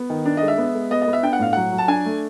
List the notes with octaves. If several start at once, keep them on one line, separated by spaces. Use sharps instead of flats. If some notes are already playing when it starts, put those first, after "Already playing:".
Already playing: B3
D#3
D4
D#5
G#3
E5
B3
G#3
B3 D#5
D#5
B3
E5
D4 G5
F#5
A2 F5
F#3 F#5
F#3
A5
D4 G#5
A3